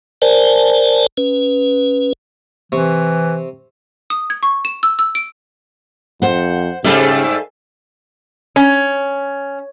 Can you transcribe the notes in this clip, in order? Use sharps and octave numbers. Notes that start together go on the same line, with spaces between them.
A#4 C5 D5 G#5 A5
C#4 B4
C3 E3 C#6
D#6
G#6
C#6
E7
E6
E6
D7
F2 C5 F#5
G#2 C#3 G3 A3 A4 F5 G#5
C#4